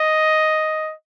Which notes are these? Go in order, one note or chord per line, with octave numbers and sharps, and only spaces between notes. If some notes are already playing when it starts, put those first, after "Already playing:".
Already playing: D#5